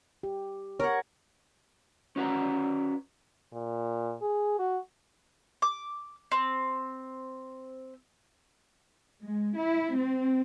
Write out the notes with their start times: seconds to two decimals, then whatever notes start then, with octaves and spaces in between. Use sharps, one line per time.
0.23 G4
0.80 A#4 C#5 F#5
2.16 C#4 F#4 B4 A#5
3.53 A#2
4.22 G#4
4.59 F#4
5.62 D6
6.32 C4
9.24 G#3
9.57 E4
9.94 C4